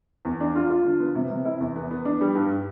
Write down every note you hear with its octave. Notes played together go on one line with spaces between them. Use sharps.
E2
D4
F4
F4
D3
B3
C3
C3
E4
E2
B3
B3
D4
G3
G2